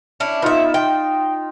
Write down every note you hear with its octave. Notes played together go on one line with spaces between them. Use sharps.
C#4 D4 E4
B3 D#4 F4 E5
G5